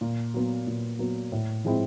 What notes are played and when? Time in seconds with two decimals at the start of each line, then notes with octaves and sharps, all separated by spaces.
0.01 A#2
0.34 F#3 B3
0.67 A#2
0.99 F#3 B3
1.32 A2
1.65 F3 G#3 C4 E4